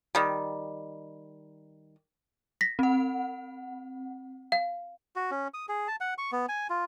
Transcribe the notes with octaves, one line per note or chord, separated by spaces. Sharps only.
D#3 G3
A#6 B6
C4 F#5
F5
F#4
C#4
D#6
G#4
A5
F#5
C#6
B3
G#5
F4